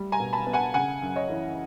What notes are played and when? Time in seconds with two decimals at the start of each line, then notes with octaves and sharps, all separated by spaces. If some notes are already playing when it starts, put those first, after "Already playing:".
Already playing: G3 A3
0.12 G#5 A#5
0.20 B2
0.33 A5 B5
0.47 B3
0.53 F#5 G#5
0.74 C#3 F#5 G#5
1.02 F#2
1.16 C#5 D#5
1.30 E3